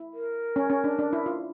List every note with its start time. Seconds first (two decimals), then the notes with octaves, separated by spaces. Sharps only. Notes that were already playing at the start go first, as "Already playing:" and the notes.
Already playing: E4
0.14 A#4
0.56 C#4
0.70 C#4
0.84 D4
0.99 D4
1.13 E4
1.26 F4